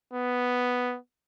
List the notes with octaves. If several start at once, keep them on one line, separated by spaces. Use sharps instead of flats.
B3